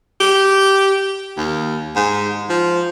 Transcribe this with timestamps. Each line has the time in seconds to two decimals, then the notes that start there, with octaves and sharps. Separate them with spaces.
0.20 G4
1.37 D#2
1.95 G#2
2.49 F3